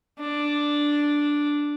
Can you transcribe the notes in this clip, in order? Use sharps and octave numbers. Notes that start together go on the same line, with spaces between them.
D4